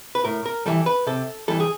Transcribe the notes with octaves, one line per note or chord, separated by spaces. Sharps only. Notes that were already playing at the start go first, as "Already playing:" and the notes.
B4
A2 A#4
A#4
E3 G3 A4
B4
C3 A4
E3 G3 A4
G#4